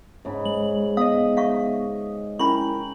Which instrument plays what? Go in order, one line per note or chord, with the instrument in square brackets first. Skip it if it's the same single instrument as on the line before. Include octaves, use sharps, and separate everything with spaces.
[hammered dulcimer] G#2 C#3 B5
[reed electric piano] G#3 [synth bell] F#7
[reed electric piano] B3 [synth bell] D#5 D#6 [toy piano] F5
[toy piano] E5 F5 C#6
[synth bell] C#4 F#7 [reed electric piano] E4 A#4 A#5 [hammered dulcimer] G5 [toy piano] B5 C#6